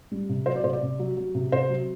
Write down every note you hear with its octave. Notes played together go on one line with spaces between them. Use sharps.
G3
C3
F#3 C5
D5
C3 C5
D5
C3
F#3
F#3
C3
C3 C5
F#3